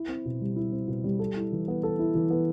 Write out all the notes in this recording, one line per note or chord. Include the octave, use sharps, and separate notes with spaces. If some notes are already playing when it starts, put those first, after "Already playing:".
Already playing: E4
C4
B2
G3
E4
C4
B2
G3
A4
E4
E3
B3
A4
E4
E3
B3